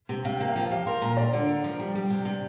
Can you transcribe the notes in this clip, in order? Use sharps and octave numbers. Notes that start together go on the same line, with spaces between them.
C3
C3 F5
A#3 G5
F5
F3 G5
G4 F5
A#4 C6
A#2 A#5
F4 D5
D3
A#4
F3
G3
G3
C3
C3